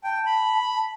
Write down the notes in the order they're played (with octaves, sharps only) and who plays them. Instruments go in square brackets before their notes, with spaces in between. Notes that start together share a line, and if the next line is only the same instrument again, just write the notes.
[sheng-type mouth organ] G5 [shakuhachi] A5
[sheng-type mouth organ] B5